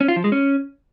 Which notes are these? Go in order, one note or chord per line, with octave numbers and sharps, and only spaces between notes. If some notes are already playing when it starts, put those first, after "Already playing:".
C#4
F4
F3
G#3
C#4